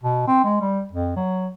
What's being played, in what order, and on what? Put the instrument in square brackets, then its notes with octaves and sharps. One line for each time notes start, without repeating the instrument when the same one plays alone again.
[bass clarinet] B2
C4
G#3
G3
F2
F#3